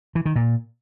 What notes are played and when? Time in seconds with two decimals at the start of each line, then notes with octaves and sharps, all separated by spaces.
0.15 E3
0.25 D#3
0.36 A#2